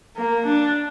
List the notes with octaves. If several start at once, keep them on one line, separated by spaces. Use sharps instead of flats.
A#3
D4